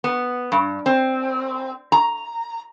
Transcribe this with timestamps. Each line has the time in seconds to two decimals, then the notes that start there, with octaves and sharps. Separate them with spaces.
0.04 B3
0.52 G2
0.86 C4
1.92 A#5